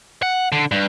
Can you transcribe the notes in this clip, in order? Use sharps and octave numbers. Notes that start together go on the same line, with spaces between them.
F#5
D3
G2